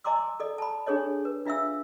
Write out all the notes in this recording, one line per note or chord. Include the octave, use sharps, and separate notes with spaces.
D#5 G#5 A#5 C6 D6 E6
A4 D5 D#5
A5 B5
D4 G#4 A4 C#5 D#5
B4
D4 F4 E5 F5 E6